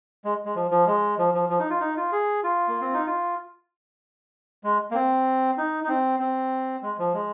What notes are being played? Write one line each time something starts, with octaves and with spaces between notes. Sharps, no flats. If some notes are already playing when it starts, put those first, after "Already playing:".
G#3
G#3
F3
F3
G#3
F3
F3
F3
D#4
F4
D#4
F4
G#4
F4
A#3
C4
D#4
F4
G#3
A#3
C4
D#4
D#4
C4
C4
G#3
F3
G#3